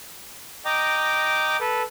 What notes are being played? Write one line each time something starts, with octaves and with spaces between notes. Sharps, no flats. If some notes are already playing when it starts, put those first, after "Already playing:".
D#5 G5 A#5 D6
A4 B4